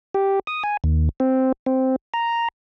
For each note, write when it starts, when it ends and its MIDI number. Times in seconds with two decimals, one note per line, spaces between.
0.14 0.40 67
0.47 0.63 87
0.64 0.77 80
0.84 1.09 39
1.20 1.52 60
1.66 1.96 60
2.14 2.48 82